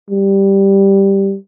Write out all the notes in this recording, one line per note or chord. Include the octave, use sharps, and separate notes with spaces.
G3